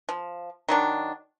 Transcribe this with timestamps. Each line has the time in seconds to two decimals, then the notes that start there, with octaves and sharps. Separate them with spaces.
0.09 F3
0.68 D#3 F#3 D4